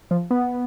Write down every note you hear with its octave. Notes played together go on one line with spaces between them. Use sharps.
F3
B3